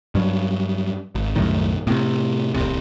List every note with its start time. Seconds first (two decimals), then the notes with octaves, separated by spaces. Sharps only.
0.15 G2 F#3
1.15 G#1
1.36 C2 F#2 A2 D#3
1.87 A2 C3
2.54 D1 C2 C3